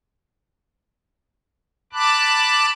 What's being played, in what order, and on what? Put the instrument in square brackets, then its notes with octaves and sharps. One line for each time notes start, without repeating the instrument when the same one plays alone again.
[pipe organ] A5 B5 D6 F#6